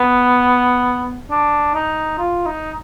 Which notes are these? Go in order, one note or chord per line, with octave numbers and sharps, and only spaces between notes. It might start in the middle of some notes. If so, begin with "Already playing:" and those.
Already playing: B3
D4
D#4
F4
D#4